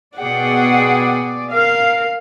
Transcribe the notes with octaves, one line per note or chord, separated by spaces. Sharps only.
B2 G#4 D5 F#5 G5
A#4 F5